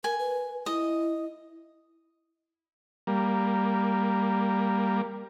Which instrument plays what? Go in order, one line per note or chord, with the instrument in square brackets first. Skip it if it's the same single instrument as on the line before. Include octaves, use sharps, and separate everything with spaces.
[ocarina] A#4 [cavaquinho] G#5
[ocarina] B4
[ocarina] E4 [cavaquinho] D#5
[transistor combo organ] G3 A#3